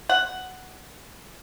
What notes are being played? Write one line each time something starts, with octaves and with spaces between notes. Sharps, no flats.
F#5